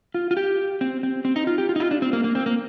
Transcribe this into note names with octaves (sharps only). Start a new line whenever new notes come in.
F4
F4
G4
C4
C4
C4
D#4
F4
G4
F4
D#4
F4
D4
C4
A#3
A#3
C4
A#3